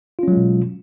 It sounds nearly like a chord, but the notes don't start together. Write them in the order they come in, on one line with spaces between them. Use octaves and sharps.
F4 C#4 F#3 G#3 B2